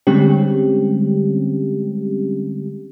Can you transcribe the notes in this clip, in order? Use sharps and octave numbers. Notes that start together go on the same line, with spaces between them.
D3 G3 G#3 C4 C#4 G4